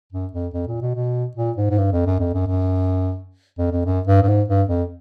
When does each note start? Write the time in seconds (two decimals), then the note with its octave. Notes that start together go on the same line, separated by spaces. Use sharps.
0.12 F#2
0.33 F2
0.54 F2
0.68 A#2
0.82 B2
0.95 B2
1.37 A#2
1.57 G#2
1.70 G#2
1.78 G2
1.92 F2
2.06 F#2
2.20 F2
2.34 F#2
2.47 F#2
3.59 F2
3.72 F2
3.86 F#2
4.07 G2
4.22 G2
4.28 G#2
4.48 G2
4.69 F2